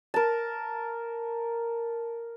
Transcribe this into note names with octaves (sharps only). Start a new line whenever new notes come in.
A#4 A5